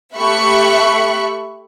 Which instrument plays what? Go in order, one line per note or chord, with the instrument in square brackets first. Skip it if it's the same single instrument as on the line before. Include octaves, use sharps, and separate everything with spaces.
[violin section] A3 G4 E5 B5 C#6 F#6